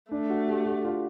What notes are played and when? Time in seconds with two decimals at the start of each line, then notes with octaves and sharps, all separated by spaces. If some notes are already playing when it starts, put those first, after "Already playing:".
0.11 A3 D4
0.30 F#4
0.48 G4
0.65 F#4
0.85 F4